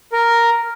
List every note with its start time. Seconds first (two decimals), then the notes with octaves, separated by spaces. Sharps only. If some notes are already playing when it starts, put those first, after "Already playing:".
0.13 A#4